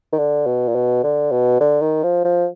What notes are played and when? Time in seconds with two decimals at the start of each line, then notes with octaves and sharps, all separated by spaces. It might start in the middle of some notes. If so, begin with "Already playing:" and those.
0.13 D#3
0.18 D3
0.46 B2
0.68 A#2
0.75 B2
1.04 D3
1.31 B2
1.60 D3
1.82 D#3
2.03 F3
2.24 F3